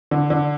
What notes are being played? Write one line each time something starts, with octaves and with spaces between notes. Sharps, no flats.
D3
D3